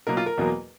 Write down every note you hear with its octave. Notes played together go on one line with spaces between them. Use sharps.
B2 F#3 A#3 A#4
F4
A#4
E2 B2 F#3 A#3